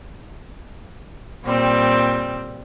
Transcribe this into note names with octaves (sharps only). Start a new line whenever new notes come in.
A#2 G3 C4